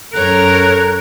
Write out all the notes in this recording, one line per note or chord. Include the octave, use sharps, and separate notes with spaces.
F#2 A4 A#4 C#5 F#6